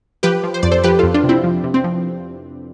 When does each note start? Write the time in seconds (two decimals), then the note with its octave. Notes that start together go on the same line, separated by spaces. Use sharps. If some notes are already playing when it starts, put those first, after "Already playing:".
0.23 F3 G4 B4
0.44 F3
0.54 C5
0.63 F2 D5
0.71 A4 C5
0.84 F3 G4 B4
0.99 F2 F4 A4
1.14 D4 F4
1.24 C3
1.29 C4 E4
1.44 F3
1.64 C3
1.74 C4
1.84 F3